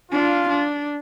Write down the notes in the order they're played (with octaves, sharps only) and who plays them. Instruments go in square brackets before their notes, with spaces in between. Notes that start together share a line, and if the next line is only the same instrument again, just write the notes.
[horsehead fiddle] D4 [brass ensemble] F4
[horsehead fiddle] D4